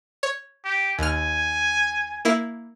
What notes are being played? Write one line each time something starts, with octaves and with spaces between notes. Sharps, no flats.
C#5
G4
D#2 G#5 F6
A#3 E4